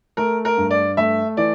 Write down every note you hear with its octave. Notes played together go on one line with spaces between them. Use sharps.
A3 A#4
A#4
G2
D5
A3 E5
E3 D5